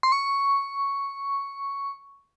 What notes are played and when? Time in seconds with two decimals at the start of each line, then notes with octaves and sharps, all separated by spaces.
0.03 C6
0.12 C#6